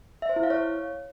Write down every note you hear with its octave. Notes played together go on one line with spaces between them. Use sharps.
E5
C5
E4
F5
C#5